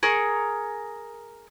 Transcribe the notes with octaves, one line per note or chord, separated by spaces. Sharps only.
G#4 A#4 C#6